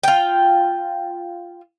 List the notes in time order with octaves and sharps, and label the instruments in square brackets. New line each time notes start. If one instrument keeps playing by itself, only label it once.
[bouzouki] F4 G5